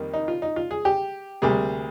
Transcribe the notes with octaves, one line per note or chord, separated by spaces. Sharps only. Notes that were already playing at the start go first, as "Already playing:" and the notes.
Already playing: F2 D#3 G3 A#3
D#4
F4
D#4
F4
G#4
G4
D2 C3 G3 A#3 G#4